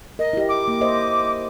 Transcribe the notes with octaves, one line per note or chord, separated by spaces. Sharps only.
A#4 D#5
E4 G4
D6
A#3
C5 D#5 E5